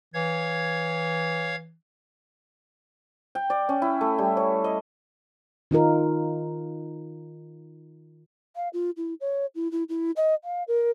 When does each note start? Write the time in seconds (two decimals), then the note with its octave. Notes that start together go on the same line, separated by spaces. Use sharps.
0.14 E3 C#5 F5 G#6
3.35 G5
3.50 D5
3.69 C#4
3.82 E4
4.01 A3
4.18 G3
4.37 C#5
4.64 D#5
5.71 D#3 D#4 F4 A#4
8.56 F5
8.73 F4
8.97 E4
9.21 C#5
9.55 E4
9.72 E4
9.89 E4
10.16 D#5
10.44 F5
10.68 A#4